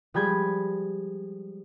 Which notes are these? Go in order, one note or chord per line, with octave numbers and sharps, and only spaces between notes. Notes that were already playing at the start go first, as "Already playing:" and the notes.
F3 G3 G#3 B5 G6 G#6